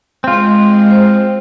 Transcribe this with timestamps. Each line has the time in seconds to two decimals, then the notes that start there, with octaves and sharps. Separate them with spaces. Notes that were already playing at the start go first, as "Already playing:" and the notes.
0.24 G#3 C4 F4
0.91 C5